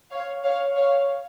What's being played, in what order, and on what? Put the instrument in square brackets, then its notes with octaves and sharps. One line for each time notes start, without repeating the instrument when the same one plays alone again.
[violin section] C#5 F5
C#5 F5
C#5 F5